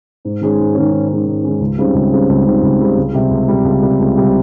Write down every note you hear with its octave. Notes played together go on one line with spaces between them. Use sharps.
G#2
D#3 G#3 C#4
G#2
D#3 G#3 C#4
G#2
D#3 G#3 C#4
G#2
D#3 G#3 C#4
C#2
C#3 G3 C4 D#4
C#2
C#3 G3 C4 D#4
C#2
C#3 G3 C4 D#4
C#2
C#3 G3 C4 D#4
C#2
C3 G3
C#2
C3 G3
C#2
C3 G3
C#2
C3 G3